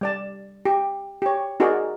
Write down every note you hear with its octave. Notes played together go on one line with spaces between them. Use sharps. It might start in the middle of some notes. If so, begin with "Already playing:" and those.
G3 D5 A5
G4
G4 C#5
D#4 F#4 G#4 A#4 D5